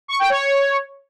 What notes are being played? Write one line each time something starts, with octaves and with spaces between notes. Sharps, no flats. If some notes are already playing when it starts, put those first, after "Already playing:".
C#6
G5
C#5